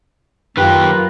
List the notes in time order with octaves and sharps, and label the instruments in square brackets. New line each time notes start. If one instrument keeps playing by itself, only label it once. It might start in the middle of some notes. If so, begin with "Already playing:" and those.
[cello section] F#2 F4 A#4 [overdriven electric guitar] D#3 G4 [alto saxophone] B4